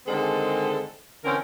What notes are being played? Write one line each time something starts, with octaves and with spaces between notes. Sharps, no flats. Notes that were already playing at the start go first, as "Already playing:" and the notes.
D3 D#3 G#3 C4 G#4 A4
D3 E3 C4 C#4 A#4